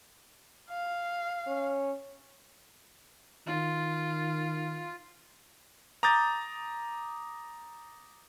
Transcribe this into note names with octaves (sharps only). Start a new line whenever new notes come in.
F5
C#4
D#3 F4
A#5 D6 D#6 G6 A6